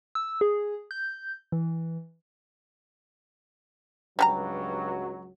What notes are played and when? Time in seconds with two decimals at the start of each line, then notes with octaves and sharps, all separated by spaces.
0.15 E6
0.41 G#4
0.91 G6
1.52 E3
4.19 C#2 G2 F#3 G3 A4 A#5